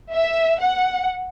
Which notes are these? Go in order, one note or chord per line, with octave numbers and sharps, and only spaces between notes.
E5
F#5